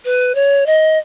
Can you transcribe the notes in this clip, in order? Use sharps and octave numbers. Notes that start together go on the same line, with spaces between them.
B4
C#5
D#5